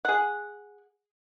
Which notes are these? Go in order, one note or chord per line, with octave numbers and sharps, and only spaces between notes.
G#4 F#5